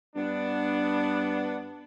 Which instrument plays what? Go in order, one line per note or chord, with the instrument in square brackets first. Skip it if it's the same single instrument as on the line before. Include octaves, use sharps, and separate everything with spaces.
[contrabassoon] G2 [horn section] B3 D4